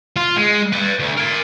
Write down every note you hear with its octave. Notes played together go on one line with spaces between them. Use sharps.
F4
G#3
B4 D5
D2
A#4 G#5